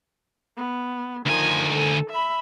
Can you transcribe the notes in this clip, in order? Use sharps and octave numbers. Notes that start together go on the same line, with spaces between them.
B3
D2 D#3 F3 G#5
A4
E5 B5